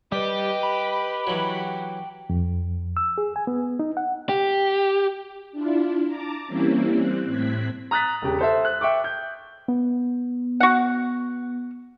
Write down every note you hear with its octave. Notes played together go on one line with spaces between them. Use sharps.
G3 G4 B4 D#5
B5
E3 F#3 F#4
F2
E6
G#4
G#5
B3
D#4
F#5
G4
D4 E4 F4
A5 A#5 D6
E3 G3 A#3 C4 C#4 E4
G3 C4 F#6
A2 C4 F#6 G#6 B6
A#5 D#6 F#6 A6 B6
E1 C#3 G4
A4 C5 E5
F#6
E5 G5 C#6 D6
G6
B3
F#4 F#5